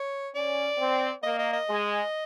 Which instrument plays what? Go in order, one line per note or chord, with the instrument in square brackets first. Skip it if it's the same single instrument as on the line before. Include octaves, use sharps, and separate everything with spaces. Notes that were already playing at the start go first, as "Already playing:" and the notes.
Already playing: [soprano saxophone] C#5
[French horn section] C#4 [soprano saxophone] D5
[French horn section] C4
[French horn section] A#3 [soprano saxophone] D#5
[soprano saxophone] D#5
D#5
[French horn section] G#3